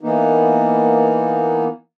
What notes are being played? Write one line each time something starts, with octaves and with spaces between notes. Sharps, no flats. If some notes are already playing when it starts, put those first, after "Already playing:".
E3 A#3 B3 D#4